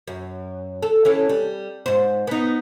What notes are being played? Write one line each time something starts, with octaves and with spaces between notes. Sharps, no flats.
F#2
A4
E3 C#4 A4
G3
G#2 C5
B3 D#4